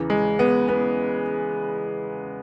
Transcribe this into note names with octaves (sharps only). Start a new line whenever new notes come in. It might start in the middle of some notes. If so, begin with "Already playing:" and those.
Already playing: E2 C#3 E3
G#3
B3
B3